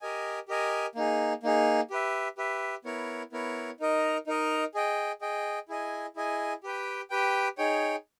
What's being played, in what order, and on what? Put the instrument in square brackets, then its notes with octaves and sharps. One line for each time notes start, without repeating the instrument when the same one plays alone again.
[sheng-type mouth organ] G4 A#4 D#5 G#5
G4 A#4 D#5 G#5
A#3 D#4 G#4
A#3 D#4 G#4
G4 B4 E5
G4 B4 E5
B3 E4 A#4 C#5
B3 E4 A#4 C#5
D#4 A#4 D#5
D#4 A#4 D#5
G#4 D#5 G5
G#4 D#5 G5
E4 G#4 D#5 G#5
E4 G#4 D#5 G#5
G4 B4 G5
G4 B4 G5
D#4 G#4 C#5 G5